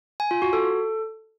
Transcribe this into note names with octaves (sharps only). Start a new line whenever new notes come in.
G#5
F4
F#4
A4